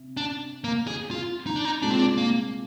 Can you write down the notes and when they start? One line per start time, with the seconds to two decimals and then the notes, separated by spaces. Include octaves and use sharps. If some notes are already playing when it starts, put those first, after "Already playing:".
Already playing: C3
0.17 D4
0.64 A#3
0.87 G#4
1.11 F4
1.47 D#4
1.56 D4
1.65 D#4
1.82 C2 A#2 G#3 D4
1.91 C4
1.99 D4
2.17 A#3